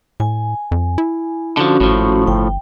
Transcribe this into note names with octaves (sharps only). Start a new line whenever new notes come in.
A2 G#5
F2
E4
D3 F3 C#4 F#4
G#1 A2 F3
G1 G5